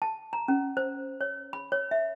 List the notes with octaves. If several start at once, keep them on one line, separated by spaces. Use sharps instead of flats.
A5
A#5
C#4
C5
C#5
B5
C#5
E5